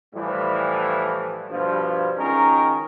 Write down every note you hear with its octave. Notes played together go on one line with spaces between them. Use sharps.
A2 E3 F3 G3
G2 B2 F3
C#2 D#3 C#4 A#4